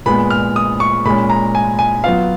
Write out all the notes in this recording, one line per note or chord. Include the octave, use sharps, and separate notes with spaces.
A#2 G#3 B3 B5
F6
D#6
C#6
A#2 G#3 C#4 B5
A#5
G#5
G#5
F#3 B3 F4 F5